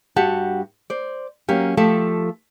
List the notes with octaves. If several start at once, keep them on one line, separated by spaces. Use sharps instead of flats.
G2 F#4 G4 F#5 A5
C5 D5
F#3 A#3 C#4 G4
F3 A3 G4 A4